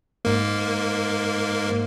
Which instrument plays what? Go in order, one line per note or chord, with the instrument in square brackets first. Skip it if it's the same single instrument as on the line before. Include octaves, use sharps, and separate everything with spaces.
[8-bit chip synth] G#2 A#3